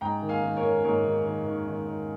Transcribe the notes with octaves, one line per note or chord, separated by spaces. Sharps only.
G#2 G5 A#5
D#3
F5 G#5
D#3
A#4 C#5
D#3
G#2 A#4 C#5
D#3
D#3
D#3
D#3
D#3